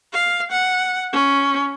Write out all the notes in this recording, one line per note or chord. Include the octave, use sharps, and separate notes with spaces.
F5
F#5
C#4